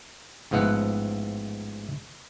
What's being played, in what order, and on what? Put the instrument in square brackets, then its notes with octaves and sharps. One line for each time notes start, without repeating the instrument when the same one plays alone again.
[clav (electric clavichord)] A1 G#2 F3 B3 E4 F#5